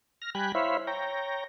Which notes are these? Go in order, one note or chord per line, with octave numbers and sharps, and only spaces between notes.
F6 A#6
G3 G5 G#5 B5 F#6
E4 C5 C#5 E5 F5 B5
C#5 G5 A#5